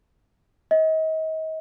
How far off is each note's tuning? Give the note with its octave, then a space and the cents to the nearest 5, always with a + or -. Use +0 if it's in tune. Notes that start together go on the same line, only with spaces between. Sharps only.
D#5 +35